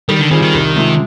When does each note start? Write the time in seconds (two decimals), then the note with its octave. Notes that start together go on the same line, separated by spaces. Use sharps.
0.09 D#3 G3
0.20 D3
0.31 D#3 G3 C4 F4 G#4
0.42 D#3
0.54 C2
0.76 C3 F3 G#3